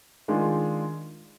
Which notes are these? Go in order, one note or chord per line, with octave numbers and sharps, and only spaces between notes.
D#3 G#3 D4 F4